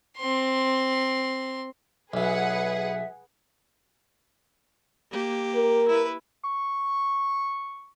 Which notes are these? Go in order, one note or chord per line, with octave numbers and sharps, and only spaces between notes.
C4 C6
B1 F#3 G#4 B4 E5 F#5
A#3 G4
A#4
E4 B4
C#6